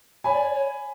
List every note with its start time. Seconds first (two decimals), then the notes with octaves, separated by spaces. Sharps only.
0.24 C#5 G#5 B5
0.33 D5
0.42 C#5
0.53 C#5